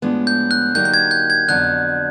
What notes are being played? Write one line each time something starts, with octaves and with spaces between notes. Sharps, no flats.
A2 F3 G#3 B3 D4
G6
F#6
D3 F#3 A#3 D#4 G4 G6
G6
G#6
G6
G#6
F2 D3 F#3 B3 D4 F#6